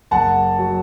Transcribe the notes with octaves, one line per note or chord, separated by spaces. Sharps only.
F#1 F#5 A5
F#3